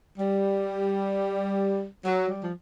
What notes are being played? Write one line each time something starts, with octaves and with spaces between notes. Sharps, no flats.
G3
F#3
G3
F3